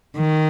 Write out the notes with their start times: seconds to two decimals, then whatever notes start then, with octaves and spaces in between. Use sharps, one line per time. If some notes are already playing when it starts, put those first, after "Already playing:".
0.17 D#3